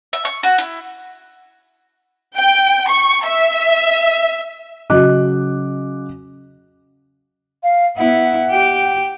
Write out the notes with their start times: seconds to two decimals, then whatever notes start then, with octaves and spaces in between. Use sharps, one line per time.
0.13 E5
0.25 C#6
0.43 F#4
0.58 E4
2.36 G5
2.88 C#6
3.25 E5
4.90 C#3 F#3 F#4 D#5 D6 F#6
7.63 F5
7.97 B3 E4 F#5
8.51 G4 G5